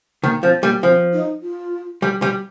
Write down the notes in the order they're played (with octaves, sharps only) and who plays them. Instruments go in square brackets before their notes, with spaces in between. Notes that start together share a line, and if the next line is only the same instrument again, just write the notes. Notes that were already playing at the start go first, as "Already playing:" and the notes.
[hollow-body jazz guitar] D#3 [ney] A#3
[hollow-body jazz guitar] F3 [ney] C4
[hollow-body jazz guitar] G3 [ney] A#3
[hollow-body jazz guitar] F3 [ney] C4
[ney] D#4
F4
[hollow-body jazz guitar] G3
G3